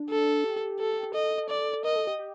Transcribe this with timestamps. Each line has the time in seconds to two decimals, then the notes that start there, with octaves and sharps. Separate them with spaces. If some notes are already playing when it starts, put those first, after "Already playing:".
Already playing: D4
0.10 A4
0.44 G4
0.79 A4
1.14 A4 D#5
1.49 D5
1.84 A#4 D#5
1.96 A4
2.07 G4
2.19 G4